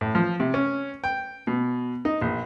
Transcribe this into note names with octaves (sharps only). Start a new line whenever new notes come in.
A2
F3
C3
C#4
G5
B2
D#4
A#1